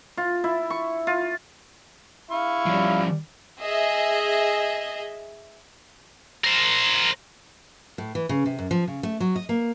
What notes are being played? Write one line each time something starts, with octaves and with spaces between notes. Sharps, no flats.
F4
E4
C#6
F4
E4 F5 C#6
F3 G3 C#4
G#4 D#5 E5
A#4 C5
A2
E3
C#3
C3
F#2
F3
C#3
A3
F#3
D#5
A#3